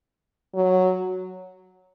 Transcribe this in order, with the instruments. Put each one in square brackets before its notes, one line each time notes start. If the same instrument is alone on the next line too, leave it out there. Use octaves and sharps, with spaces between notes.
[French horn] F#3